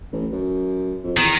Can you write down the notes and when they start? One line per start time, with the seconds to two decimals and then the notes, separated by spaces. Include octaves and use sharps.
0.12 A1
0.32 F#2
1.04 F2
1.17 E2 D#3